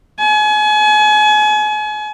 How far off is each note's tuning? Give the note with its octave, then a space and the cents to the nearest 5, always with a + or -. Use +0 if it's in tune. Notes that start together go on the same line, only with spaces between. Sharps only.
G#5 +35